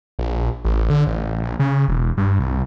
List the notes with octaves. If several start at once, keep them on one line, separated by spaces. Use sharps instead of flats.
A#1
A1
D3
A1
A#1
C#3
E1
G2
C2